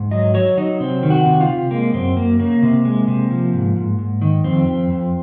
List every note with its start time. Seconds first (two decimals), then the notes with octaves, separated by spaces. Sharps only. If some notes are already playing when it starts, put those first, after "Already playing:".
Already playing: G#2
0.11 F#3 D#5
0.34 F#3 C#5
0.57 F#3 D#4
0.80 C3 C4
1.03 D#3
1.10 F#4
1.26 C3
1.41 F4
1.48 C3
1.71 G#3 A#3
1.94 F#2 C4
2.16 F#2 A#3
2.39 C#3 A#3
2.63 C3
2.85 G#3
3.08 C3
3.30 F3
3.53 G#2
3.76 G#2
3.99 G#2
4.22 D#3
4.44 F2 C4
4.67 F2
4.90 F2